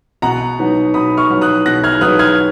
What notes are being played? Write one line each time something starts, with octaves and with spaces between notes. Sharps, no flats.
B2 F#5 A#5
F#3 B3 D#4
B2 B5 D#6
C#6 F6
F#3 B3 D#4
D#6 F#6
B2 F#6 A#6
F6 G#6
F#3 B3 D#4 D#6 F#6
F6 G#6